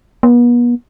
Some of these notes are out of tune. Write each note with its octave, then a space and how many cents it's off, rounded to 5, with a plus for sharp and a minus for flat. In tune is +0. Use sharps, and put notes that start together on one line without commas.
B3 -40